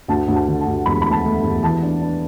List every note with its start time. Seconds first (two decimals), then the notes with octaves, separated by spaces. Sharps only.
0.08 D2 A5
0.28 D2
0.35 A5
0.48 D3
0.60 A5
0.66 D2
0.86 E1 B5
1.02 A3 B5
1.11 A5
1.25 A3
1.43 E1
1.63 E3 A5
1.83 D4
2.01 D4